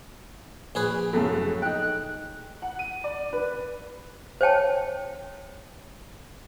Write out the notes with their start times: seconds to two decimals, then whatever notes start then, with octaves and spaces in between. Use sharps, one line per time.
0.75 A#1 G#4 B4
1.13 F#2 A2 C#3 A4
1.62 D#4 G5 F#6
2.62 F#5
2.79 D#7
3.04 D5
3.33 B4
4.41 C5 C#5 G5 A5